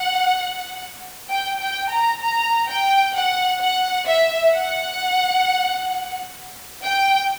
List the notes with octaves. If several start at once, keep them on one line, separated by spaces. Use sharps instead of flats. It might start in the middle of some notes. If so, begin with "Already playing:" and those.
Already playing: F#5
G5
G5
A#5
A#5
G5
F#5
F#5
E5
F#5
G5